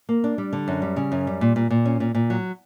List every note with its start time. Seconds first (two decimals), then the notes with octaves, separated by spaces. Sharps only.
0.09 A#3
0.24 D4
0.38 G3
0.53 D3
0.68 F#2
0.82 G3
0.96 C#3
1.12 F#2
1.27 G3
1.41 A#2
1.56 A#2
1.70 A#2
1.85 C#4
2.00 A#2
2.15 A#2
2.30 F#3